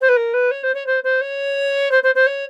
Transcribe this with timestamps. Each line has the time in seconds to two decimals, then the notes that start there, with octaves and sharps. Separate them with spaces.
0.01 C5
0.09 B4
0.16 A#4
0.34 B4
0.51 C#5
0.63 C5
0.74 C#5
0.86 C5
1.04 C5
1.21 C#5
1.91 C5
2.03 C5
2.15 C5
2.27 C#5